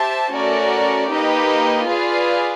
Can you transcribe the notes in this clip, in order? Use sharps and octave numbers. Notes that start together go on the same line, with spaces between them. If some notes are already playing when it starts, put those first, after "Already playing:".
Already playing: G4 C5 E5 A5
A3 C#4 F#4 A#4 D5
A#3 D#4 G4 B4 D#5
F4 G#4 B4 D5 F5